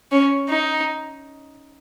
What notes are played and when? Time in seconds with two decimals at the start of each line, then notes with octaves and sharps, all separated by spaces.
0.12 C#4
0.49 D#4